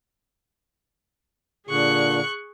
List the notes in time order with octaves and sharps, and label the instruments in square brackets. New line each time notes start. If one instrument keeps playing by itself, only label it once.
[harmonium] A#2 D3 [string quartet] G#4 C#6 F#6